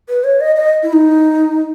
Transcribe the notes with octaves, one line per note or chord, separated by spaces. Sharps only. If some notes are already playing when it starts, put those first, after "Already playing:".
B4
C#5
D#5
D#5
E4
D#4